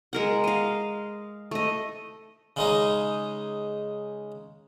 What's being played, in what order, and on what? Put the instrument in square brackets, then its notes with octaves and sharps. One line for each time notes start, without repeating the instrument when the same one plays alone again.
[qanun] G#3 A#4 F#5
D#5 F5
A3 D#5
[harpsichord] C#3 G#3 D#4